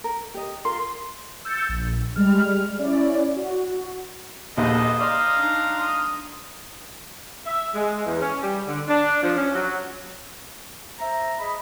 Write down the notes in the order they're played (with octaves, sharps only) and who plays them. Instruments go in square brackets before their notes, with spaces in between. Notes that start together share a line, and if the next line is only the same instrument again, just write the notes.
[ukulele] A#4
G4 D#5
[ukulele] F4 A#4 [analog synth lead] C6
[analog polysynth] E6 G6 A6 C#7
A#1
G3 G#3 F6
C#4 E4 D5
F#4
[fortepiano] A#1 D#2 [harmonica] B3 A4 D#5 [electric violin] C5 D#6
[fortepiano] D5 D#5 [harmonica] F5 A#5 C6
[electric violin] D4 D#4
D#6
[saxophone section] E5
G#3
E2
C#4
G3
D3
D4
F3
C#4
F#3
[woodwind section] C5 E5 A#5
G#4 D#5 B5